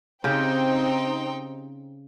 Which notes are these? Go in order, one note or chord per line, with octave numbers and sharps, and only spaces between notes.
C#3 C4 D#4 G4 G5